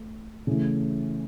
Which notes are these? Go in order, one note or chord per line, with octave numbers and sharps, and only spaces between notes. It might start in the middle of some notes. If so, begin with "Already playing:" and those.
Already playing: A3
C#3 E3 A3